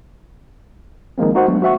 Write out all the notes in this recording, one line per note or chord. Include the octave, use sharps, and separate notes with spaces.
D#3 F3 G#3 A#3 C4
D#4 F#4 C5 F#5
F#3 G#3 A3 B3 D4
F#4 C5 E5 F#5 C#6